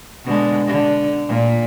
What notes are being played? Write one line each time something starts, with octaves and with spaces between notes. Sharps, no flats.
B2 D3 G#3
D3
A#2